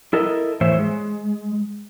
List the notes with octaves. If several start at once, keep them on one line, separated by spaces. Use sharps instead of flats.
E4 A4 A#4 D#5
A2 E3 C5 C#5 E5
G#3